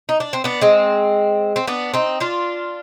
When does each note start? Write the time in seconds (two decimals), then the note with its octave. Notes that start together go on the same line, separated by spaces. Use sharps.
0.09 D#4
0.20 D4
0.33 C4
0.44 B3 D4
0.61 G#3 C4
1.56 C4
1.67 B3 D4
1.94 C4 D#4
2.20 D4 F4